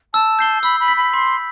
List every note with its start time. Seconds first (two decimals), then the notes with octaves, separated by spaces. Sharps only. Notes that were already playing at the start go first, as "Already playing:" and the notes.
0.14 A5 E6
0.39 G6 C7 G7
0.63 B5 E6
0.80 B5
0.88 B6 F#7
0.97 B5
1.13 B5 C6